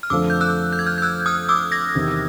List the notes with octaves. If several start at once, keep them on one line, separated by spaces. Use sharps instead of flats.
F6
F2 D3 F3 A3 D4 D6 E6
G6
E6 F#6
G6
G#6
F6 G6
G6
E6 F#6
D#6 F6
D6 E6
G#6 A#6
E2 C3 D#3